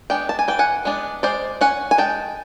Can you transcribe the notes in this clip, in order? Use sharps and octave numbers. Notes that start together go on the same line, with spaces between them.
G#3 B3 D4 G5
A5
G#5
E3 G5
F#5 G#5
G#3 B3 D4
G#3 C5 D5
C#4 F#5 G#5
G#5
G#3 G5 A5